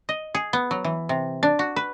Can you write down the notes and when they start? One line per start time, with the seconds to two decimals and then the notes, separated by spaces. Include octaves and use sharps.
0.09 D#5
0.35 G#4
0.53 B3
0.71 F#3
0.84 E3
1.09 C3
1.43 D4
1.59 F#4
1.76 B4